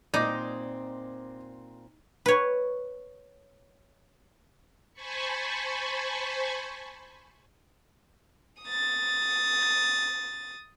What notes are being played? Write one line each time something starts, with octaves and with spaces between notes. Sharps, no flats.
A#2 C4 D#4 D5 D#5 A#5 D6
B4 C#5
C5 G#5 A5 B5 C#6
D#6 A6